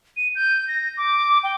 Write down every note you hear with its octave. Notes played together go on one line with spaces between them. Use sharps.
D#7
G6
A#6
D6
G5